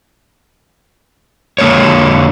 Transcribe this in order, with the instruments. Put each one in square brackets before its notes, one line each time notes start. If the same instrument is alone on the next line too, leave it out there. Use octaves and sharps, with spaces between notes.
[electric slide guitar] D3 A#3 A#4 C#5